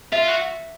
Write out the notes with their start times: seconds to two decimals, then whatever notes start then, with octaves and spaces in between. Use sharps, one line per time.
0.12 F4 E5
0.29 F#4